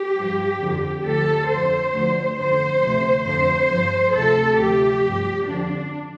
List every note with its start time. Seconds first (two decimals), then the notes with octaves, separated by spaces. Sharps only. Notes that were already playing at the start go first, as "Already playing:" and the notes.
Already playing: G4
0.16 G2 F3
0.60 F2 D3 F3
1.04 D2 D3 F3 A4
1.49 F2 D3 F3 C5
1.93 D2 D3 F3
2.37 F2 D3 F3 C5
2.82 D2 C3 F3
3.25 F2 D3 F3 C5
3.70 G2 F3
4.14 D2 C3 F3 A4
4.58 D2 C3 F3 G4
5.02 G2 F3
5.46 F2 D3 F3 D4